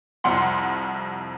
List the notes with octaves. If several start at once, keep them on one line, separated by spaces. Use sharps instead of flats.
C2 F2 F#5 C6